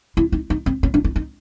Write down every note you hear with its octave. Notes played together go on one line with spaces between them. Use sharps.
E4
D#4
D#4
C4
C#4
D4
D#4
D#4